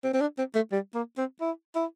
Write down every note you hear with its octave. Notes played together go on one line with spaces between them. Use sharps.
C4
C4
D4
C4
A3
G3
A#3
C4
E4
E4